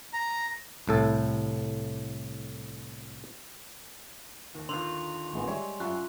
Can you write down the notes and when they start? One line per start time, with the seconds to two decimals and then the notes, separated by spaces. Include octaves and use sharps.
0.13 A#5
0.87 C2 A2 A4
4.55 D#2
4.69 D3 D#3 F4 C6 F7
5.34 A1 G#3 B3
5.48 G3 G#3 C#5 E5
5.80 F#2 F4 E5 C#6 F#6